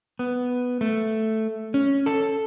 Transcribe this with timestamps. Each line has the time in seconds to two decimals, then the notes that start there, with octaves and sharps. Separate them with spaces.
0.19 B3
0.81 A3
1.74 C#4
2.06 A4